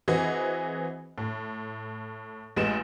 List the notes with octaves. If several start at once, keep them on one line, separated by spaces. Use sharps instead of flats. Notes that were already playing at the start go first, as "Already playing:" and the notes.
E3 C4 F#4 G#4 B4 D#5
A2
A1 G#3 B4 E7